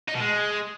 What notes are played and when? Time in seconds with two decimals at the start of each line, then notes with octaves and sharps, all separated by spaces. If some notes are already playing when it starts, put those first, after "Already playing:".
0.08 D#4
0.14 B2
0.21 G#3